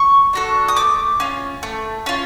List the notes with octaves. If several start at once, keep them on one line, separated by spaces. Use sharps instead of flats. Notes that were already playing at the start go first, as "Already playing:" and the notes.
Already playing: C#6
D4 F#4 A4
D#6
A3 D6
C#4 F4
A3
C#4 F4